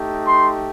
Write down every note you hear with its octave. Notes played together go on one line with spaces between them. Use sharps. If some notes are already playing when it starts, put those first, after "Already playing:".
Already playing: A3 D#4 G4
C6